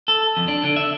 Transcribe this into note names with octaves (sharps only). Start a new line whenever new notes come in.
A4
F2
D4
D3
E5